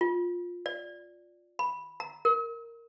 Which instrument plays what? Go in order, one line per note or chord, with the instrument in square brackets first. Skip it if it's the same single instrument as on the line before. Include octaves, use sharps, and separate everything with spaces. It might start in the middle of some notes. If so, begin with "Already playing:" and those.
[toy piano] F4
D5
B5
A#5
A#4